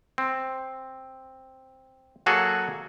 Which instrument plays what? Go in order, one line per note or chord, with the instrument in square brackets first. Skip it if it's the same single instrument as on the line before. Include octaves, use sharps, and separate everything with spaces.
[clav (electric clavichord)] C4
F#3 A#3 F#4 G#4 A4